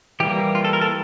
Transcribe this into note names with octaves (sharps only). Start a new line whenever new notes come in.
E3 G3 A#3 G4
F4
A4
A#4
A4